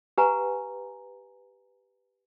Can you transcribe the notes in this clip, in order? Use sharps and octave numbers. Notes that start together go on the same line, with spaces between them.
G4 B4 F#5 G#5 A#5